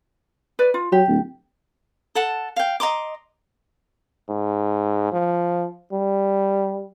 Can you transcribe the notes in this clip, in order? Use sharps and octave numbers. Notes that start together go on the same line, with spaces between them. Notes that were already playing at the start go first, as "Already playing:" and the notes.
B4 D5
F4
F#3 G4
D1
A4 F#5 A5
F5 G5
D#5 A#5 C6 D6
G#2
F3
G3